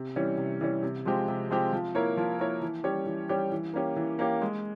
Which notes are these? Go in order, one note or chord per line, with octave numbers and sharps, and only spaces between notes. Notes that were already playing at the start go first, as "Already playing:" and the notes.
Already playing: C3
E3 G3 C#4
C3
E3 G3 C#4
C3
F3 G#3 C4 G4
C3
F3 G#3 C4 G4
F3
A#3 E4 A#4 C#5
F3
A#3 E4 A#4 C#5
E3
G3 C#4 G4 C#5
E3
G3 C#4 G4 C#5
E3
A#3 C#4 G4
E3
A#3 C#4 G4
G#3